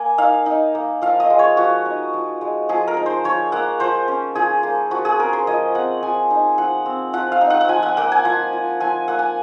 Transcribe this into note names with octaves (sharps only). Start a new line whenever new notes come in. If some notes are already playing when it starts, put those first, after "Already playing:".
Already playing: A#3 G#5
D#4 F5
D#4
A#3
F3 F5
D#5
G#3
C#5
F3 F#4
D#4
F3
G#3
F3 G#4
A#4
D#4
C5
F3 C#5
A#3 F#5
F3 C5
C#4
F3 G#4
A#3
F3 F#4
G#4
C#4 A#4
C5
F3 D#5
C4 F#5
F3 G#5
D#4
F3 F#5
C4
F3 F#5
F5
D#4
F#5
F#5
F3 G#5
F#5
A#3 F#5
G#5
F3 F#5
F4
F3 G#5
A#3 F#5
G#5